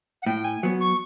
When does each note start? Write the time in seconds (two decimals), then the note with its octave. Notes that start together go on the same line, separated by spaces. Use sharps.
0.22 F#5
0.26 A2 G5
0.44 G#5
0.63 F#3 B3
0.81 C#6